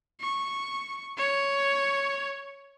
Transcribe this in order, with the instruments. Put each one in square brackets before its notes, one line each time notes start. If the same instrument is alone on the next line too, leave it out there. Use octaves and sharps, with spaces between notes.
[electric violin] C#6
C#5